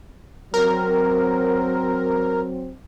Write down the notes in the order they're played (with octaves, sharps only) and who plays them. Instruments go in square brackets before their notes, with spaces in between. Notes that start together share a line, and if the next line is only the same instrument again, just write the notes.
[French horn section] F#3 C4 [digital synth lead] A#4